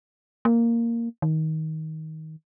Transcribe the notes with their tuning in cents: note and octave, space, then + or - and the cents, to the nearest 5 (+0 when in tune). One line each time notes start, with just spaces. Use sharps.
A#3 -5
D#3 +20